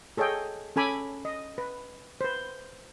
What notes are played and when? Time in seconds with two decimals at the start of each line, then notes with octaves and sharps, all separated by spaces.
0.17 G#4 A4 C#5 D#5 G5
0.76 C#4 A4 G#5 B5 D6
1.25 D#5
1.58 B4
2.21 B4 C5